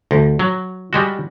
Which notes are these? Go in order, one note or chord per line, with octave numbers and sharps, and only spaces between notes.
D2
F#3
G3 G#3 F#4